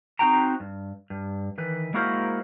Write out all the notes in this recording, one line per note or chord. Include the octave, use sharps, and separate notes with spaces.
C4 D#4 F#4 G5 A#5
G2
G2
D#3 E3 B4
G#3 A#3 E4 F#4 A#4 C5